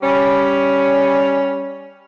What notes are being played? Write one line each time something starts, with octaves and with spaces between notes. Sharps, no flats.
G3 C#4